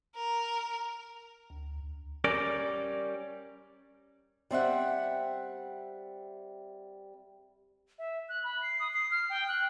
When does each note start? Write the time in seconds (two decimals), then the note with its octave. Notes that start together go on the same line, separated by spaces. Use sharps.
0.16 A#4
1.50 D2
2.24 G3 C#4 A#4 D5
4.51 G3 C4 E5 F#5
7.99 E5
8.29 F#6
8.44 B5
8.63 C7
8.80 D#6
8.94 C7
9.11 F6
9.29 G5
9.48 F#6